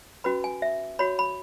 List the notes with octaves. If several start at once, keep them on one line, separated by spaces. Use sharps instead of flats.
C#4 F#4 B4 B5
G#5
E5
F#4 C#5 B5
B5